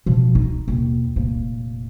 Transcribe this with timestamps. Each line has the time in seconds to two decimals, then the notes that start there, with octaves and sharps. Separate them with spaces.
0.06 B2 F3
0.35 D#4
0.68 D#2 B2
1.16 F1 A#2